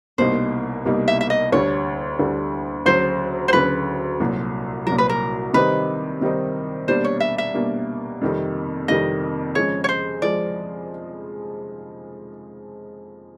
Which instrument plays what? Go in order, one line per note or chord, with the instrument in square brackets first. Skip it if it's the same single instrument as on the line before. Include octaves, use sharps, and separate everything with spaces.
[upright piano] C2 B2 G3 A#3 D#4 [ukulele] C5
[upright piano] C2 B2 G3 A#3 D#4
[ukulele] E5
E5
D#5
[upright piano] D2 D3 G3 [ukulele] C#5
[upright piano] D2 D3 G3
[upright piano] D2 C#3 F#3 [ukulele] C5
[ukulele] C5
[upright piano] D2 C#3 F#3 [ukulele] B4
[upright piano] C2 A#2 F#3
[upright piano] C2 A#2 F#3 [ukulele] A#4
[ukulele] B4
A#4
[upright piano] C3 D#3 G3 C4 D#4 [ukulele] B4
[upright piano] C3 D#3 G3 C4 D#4
[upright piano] B2 G3 A#3 D4 [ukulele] C5
[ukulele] C#5
E5
E5
[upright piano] B2 G3 A#3 D4
F2 C3 D#3 G3
[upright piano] F2 C3 D#3 G3 [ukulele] D#5
[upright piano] C#3 F3 G#3 [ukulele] C#5
[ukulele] C#5
C5
[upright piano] F3 G#3 [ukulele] D5